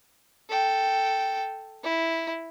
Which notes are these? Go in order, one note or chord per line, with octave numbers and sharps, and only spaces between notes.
A4 G5
E4